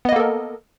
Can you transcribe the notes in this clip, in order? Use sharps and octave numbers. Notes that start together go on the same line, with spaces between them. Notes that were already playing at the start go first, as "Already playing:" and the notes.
A#3 B3 A4 A#4 D#5